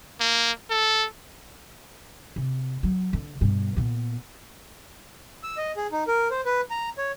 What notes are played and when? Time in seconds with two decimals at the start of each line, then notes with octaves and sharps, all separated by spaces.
0.20 A#3
0.70 A4
2.36 C3
2.83 F#3
3.13 D3
3.41 G2 B2
3.77 A#2 B3
5.43 E6
5.57 D#5
5.77 G#4
5.92 D#4
6.07 A#4
6.31 C5
6.45 B4
6.70 A#5
6.98 C#5